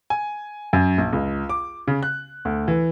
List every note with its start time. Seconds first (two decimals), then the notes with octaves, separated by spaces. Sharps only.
0.10 G#5
0.73 F#2
0.98 A#1
1.13 C#2
1.49 D6
1.88 C#3
2.03 F#6
2.45 D2
2.68 E3